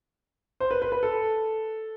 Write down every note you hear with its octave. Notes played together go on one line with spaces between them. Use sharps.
C5
B4
B4
B4
A4